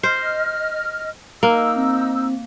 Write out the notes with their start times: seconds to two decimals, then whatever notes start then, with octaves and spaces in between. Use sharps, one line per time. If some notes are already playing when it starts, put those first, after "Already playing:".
0.03 C5 D#5 F6
1.43 A#3 D#4 E6
1.76 C4